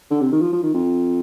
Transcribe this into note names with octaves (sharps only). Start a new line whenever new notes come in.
D3
C3
D#3
F3
F3
D#3
F2